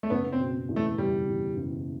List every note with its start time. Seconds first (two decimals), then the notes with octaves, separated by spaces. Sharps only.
0.03 A3
0.10 F#1 B3
0.32 C4
0.39 B2
0.69 E2
0.76 A3
0.98 F#1 G3
1.28 E2
1.56 F#1